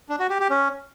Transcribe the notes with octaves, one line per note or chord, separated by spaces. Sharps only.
D4
F#4
G4
G4
C#4